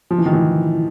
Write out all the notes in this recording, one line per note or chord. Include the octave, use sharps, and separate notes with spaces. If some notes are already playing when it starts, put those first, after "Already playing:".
F3
E3
D#3
E3